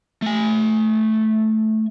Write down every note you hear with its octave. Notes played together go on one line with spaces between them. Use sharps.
A3 G#5